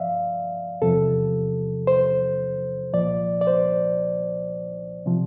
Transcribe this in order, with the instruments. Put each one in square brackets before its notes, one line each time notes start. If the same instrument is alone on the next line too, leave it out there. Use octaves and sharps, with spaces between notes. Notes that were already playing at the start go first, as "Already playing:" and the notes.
Already playing: [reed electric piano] G2 F3 D5 E5 F5
E2 C3 F3 A4
C5
C2 A#2 F3 D5
D5
C5
C3 F3